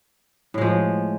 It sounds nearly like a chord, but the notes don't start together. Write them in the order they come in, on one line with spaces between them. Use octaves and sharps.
A2 G#3 F3